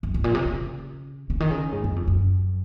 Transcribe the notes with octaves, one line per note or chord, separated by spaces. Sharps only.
F#2
G#2
A#2
C3
C#3
C#3
D#3
C#3
G#2
F#2
F2
F#2